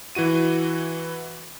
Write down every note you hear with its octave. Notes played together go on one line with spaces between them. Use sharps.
E3 E4 F#4 D#7